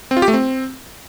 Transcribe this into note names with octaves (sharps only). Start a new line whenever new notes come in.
C4
F4
G4
A3
C4